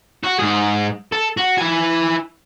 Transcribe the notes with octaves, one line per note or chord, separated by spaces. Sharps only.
F#4
G#2 G#4
A4
F#4
E4 G#5